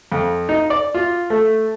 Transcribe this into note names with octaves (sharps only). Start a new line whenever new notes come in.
F2
D#4
D5
F4
A3